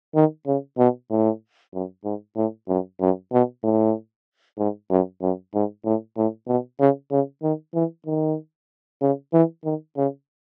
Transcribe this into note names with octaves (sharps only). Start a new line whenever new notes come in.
D#3
C#3
B2
A2
F#2
G#2
A2
F#2
F#2
B2
A2
G#2
F#2
F#2
G#2
A2
A2
B2
C#3
C#3
D#3
E3
D#3
C#3
E3
D#3
C#3